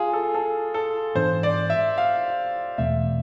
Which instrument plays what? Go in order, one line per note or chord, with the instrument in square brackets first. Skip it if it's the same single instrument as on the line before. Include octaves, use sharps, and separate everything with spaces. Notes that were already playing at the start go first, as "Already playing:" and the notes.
Already playing: [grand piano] F4 G#4
A4
A4
A4
[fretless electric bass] G#2 E3 B3 D4 [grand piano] C5
[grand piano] D5
E5
F5
[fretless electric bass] E2 B2 A3 C4 [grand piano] E5